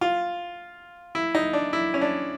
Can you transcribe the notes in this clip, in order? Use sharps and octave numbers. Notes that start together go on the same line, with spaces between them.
F4
E4
D#4
D4
E4
C#4
D4